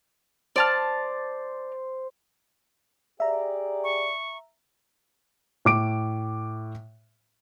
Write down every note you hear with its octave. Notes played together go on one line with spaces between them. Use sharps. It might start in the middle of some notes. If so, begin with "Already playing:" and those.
C5 D5 A5 F6
G4 G#4 D5 E5 A#5
C#6
A2 D6 D7